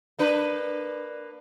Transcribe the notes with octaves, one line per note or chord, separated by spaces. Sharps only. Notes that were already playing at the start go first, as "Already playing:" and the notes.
A#3 D4 B4